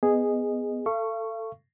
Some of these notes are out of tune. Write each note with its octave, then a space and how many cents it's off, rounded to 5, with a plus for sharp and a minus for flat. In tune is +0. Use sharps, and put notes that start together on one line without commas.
B3 +15 G#4 -5 D#5 -10
A4 +20 F5 -40 C#6 +0